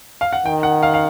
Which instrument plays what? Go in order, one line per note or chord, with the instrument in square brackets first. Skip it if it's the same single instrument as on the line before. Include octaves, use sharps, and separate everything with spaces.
[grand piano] F5
F#5
[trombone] D#3 [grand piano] G5
[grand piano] F#5
F5
F5